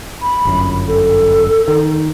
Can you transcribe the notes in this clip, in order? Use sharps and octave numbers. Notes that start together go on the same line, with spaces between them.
B5
G1 F#2
A4
D#3